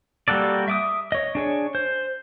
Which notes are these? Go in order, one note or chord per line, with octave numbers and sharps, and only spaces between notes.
G3 A#3 F#4 A4 D5
E5 D6 D#6
C#5 D#5
D4 G#4 C#5
C5